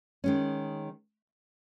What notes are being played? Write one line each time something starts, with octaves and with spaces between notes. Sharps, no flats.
D#3 G#3 C#4